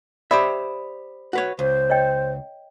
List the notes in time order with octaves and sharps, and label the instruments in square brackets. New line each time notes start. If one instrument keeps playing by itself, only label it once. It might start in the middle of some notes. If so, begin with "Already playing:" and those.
[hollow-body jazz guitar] G4 C5 E5 [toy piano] D5 B5 D#6
[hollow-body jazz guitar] F#4 B4 C#5
[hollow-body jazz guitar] C#2 [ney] C5
[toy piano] C#5 D#5 G5